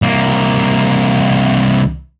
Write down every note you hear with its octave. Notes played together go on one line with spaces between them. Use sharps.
C2 A#3